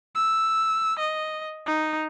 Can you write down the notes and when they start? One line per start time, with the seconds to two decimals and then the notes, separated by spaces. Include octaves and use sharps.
0.15 E6
0.99 D#5
1.66 D#4